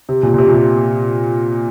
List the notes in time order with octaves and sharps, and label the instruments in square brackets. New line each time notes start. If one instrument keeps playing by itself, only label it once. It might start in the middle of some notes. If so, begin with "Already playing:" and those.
[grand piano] C3
A#2
A#2
C3
A#2
C3